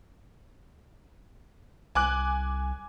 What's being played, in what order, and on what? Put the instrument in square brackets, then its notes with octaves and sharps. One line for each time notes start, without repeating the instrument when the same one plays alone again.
[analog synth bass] C2 [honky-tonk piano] G#5 D6 F#6